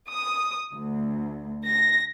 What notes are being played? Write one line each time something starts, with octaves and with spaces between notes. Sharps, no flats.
D#6
D2
A#6